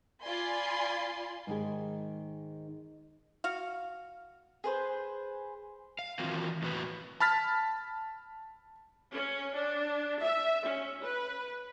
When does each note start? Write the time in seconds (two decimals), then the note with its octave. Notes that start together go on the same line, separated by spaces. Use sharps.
0.23 F4 D5 G#5 B5 C6
1.47 G#2 D#3 G#4
3.44 F#4 F5
4.64 G#4 B4 C5
5.99 F5
6.19 D#3 E3 C4 F4 F#4 A#4
6.62 E2 A2 F#4 B4
7.20 A5 B5 F6 A6 B6
9.11 C#4
9.55 D4
10.22 E5
10.66 C#4
11.04 B4